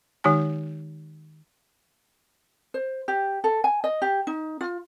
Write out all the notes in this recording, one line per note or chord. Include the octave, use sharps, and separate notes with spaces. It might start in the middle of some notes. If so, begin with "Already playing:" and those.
D#3 G#3 D#4 G4 G#5
C5
G4
A4
G#5
D#5
G4
D#4
F4